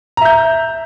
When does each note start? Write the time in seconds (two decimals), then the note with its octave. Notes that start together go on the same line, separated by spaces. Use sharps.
0.17 A#5
0.21 E5
0.25 G6